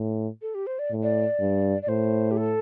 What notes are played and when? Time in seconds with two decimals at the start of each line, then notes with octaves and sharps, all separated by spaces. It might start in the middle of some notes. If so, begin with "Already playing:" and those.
Already playing: A2
0.42 A4
0.55 G4
0.67 C5
0.79 D5
0.91 A2
1.03 D5
1.40 G2
1.82 D5
1.88 A2 C5
2.31 G4
2.37 A4